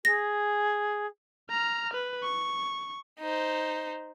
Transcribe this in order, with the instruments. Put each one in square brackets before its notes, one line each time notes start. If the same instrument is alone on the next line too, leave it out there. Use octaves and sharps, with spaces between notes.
[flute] G#4 [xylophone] A#6
[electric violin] A#5 F6
B4
C#6
[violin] D#4 C5